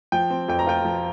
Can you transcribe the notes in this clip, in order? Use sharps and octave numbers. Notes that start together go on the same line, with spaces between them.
F3 G5
C4
F2 G5
A#5
F4 G5
F3